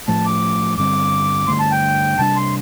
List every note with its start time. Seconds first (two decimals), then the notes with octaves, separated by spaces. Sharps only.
0.08 A2 F3 A3 A5
0.26 D6
0.78 G2 D3 G3 C4 D6
1.48 G2 D3 A3 C6
1.60 A5
1.72 G5
2.19 C3 G3 D4 A5
2.36 C6